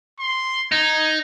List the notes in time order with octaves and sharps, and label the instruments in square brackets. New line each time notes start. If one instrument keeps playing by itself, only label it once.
[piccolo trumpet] C6
[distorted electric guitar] D#4 [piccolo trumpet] G#6